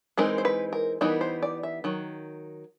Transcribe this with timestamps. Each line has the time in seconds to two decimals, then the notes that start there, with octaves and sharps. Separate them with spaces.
0.18 E3 G#3 C4 D#4 A#4
0.38 C5
0.45 B4
0.73 A#4
1.01 E3 G3 B3 D#4 A#4
1.21 C5
1.43 D5
1.63 E5
1.84 D#3 F#3